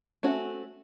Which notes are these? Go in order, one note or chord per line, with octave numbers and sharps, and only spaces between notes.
A3 C4 C#4 F#4